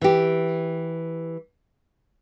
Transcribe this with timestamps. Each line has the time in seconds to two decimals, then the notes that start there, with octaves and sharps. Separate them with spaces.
0.01 E3 G4